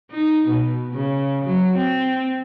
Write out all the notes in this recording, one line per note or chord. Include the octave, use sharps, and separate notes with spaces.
D#4
B2
C#3
F#3
C4